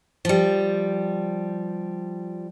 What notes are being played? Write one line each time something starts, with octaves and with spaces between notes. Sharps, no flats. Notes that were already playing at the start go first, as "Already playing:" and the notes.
F3 G3